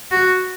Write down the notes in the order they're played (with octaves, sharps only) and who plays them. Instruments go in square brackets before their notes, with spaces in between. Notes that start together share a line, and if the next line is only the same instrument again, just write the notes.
[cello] F#4